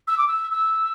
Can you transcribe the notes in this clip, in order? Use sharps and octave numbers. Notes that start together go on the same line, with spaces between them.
E6
D6
E6
E6